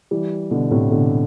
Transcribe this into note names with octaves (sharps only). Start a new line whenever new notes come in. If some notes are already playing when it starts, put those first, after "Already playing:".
E3 G3
B2 D3
A2 C3
B2 D3